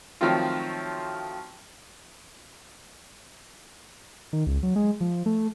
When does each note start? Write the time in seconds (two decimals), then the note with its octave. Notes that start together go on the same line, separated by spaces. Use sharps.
0.21 D#3 F3 F#3 A3 C4 F4
4.33 D#3
4.47 C#2
4.63 F#3
4.76 G#3
5.01 F3
5.26 A3